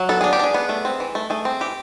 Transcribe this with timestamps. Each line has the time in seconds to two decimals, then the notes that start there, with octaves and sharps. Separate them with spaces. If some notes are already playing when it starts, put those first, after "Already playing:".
Already playing: F#3
0.09 B3 A4
0.21 D4 G#4
0.33 G4
0.39 D4 G#4
0.54 B3
0.69 A3
0.85 C4
1.00 E3
1.15 A3
1.30 A3 G#4
1.45 C4
1.60 E3 G4